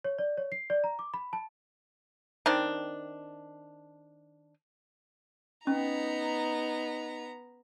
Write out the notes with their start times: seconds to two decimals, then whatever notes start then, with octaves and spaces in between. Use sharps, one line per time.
0.04 C#5
0.18 D5
0.38 C#5
0.52 C7
0.70 D5
0.84 A#5
0.99 D6
1.14 B5
1.33 A5
2.46 D#3 C4 D4
5.67 B3 C#4 D#4 A#5